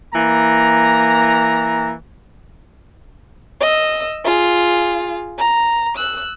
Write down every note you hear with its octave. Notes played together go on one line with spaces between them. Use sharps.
E3 A#3 A#5
D#5 E6
F4 G#4
A#5
E6 F#6